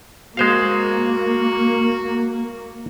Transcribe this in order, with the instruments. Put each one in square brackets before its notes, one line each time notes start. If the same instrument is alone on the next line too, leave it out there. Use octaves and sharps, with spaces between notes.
[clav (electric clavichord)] G#3 C5 F5 [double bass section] A#3 [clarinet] F#4